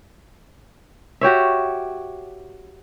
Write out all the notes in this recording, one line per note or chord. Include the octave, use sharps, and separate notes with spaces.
F#4 G4 C#5 E5